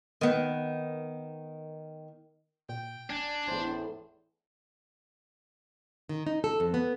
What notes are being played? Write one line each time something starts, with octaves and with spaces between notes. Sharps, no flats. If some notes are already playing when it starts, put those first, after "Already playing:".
D#3 B3
A#2 G5
D#1 D4 G#5
G1 E2 A2 C5
D#3
D#4
A4
F2
B3